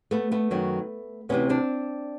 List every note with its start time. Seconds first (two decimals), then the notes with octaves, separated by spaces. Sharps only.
0.11 A3 B3
0.32 A3 B3
0.51 F#2 D#3 F#3
1.29 D2 C3 E3 B3 C#4
1.49 C4 D4